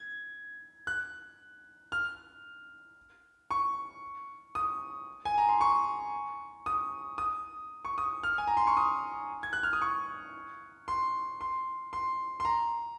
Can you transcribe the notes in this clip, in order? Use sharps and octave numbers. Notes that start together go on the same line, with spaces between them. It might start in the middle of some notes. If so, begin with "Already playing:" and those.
Already playing: G#6
F#6
F6
C#6
D#6
G#5
A#5
C6
C#6
D#6
D#6
C#6
D#6
F6
G#5
A#5
C6
C#6
D#6
G#6
F#6
F6
D#6
C#6
C6
C6
C6
C6
A#5